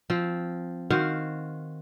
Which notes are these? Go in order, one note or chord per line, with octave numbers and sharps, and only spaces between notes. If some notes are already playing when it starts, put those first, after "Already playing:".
F3 C4
D#3 F#4 C5 F5